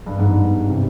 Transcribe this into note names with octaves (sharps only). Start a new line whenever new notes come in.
G2
G#2
G2
C3